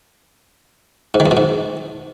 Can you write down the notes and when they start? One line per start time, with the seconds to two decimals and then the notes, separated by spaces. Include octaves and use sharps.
1.14 G#2
1.20 D#3
1.26 E2
1.31 B2
1.37 G#2